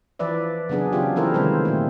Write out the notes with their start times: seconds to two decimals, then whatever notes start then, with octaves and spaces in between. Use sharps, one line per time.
0.19 E3 F3 B4 D5 E5
0.69 C#3 F#3 B3 D4 G#4
0.93 C#3 F3 C#4 F4 G4
1.16 E3 A#3 E4 A4 A#4 C5
1.34 C3 D#3 G3 G#3 C5
1.65 A#2 A3